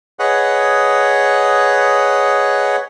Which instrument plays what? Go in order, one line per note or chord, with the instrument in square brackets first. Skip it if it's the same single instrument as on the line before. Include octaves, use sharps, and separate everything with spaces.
[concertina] G#4 B4 C#5 D#5 F#5